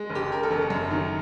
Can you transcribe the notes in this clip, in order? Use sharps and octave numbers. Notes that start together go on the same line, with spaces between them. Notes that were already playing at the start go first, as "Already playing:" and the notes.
Already playing: G#3
F#1
G4
F#1 A#4
A4
F#1
F#2
D#3